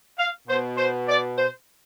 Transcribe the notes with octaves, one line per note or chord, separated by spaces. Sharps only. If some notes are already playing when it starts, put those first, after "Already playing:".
F5
B2 C5
C5
D5
C5